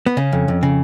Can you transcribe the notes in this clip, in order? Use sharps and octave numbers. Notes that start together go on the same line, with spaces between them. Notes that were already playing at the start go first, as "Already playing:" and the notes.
B3
C#3 C#4
F2
F2
C#3